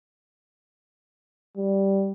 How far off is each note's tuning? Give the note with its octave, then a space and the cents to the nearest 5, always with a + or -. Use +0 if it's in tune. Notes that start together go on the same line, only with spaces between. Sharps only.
G3 -5